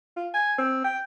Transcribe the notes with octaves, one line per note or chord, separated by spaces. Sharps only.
F4
G#5
C4
G5